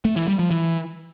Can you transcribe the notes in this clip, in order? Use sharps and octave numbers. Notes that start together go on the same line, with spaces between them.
A3
E3
G3
F3
E3